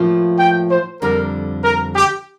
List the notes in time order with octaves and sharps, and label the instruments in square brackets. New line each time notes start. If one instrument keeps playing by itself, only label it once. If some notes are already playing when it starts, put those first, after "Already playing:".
Already playing: [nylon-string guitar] A2 F3 A#3 F4
[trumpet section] G5
C5
[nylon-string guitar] F2 D3 G3 D4 [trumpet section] A#4
[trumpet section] A#4
G4